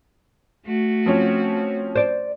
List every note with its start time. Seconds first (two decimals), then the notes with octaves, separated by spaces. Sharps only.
0.65 A3 F#4
1.06 F3 C4 C#4
1.95 C5 D5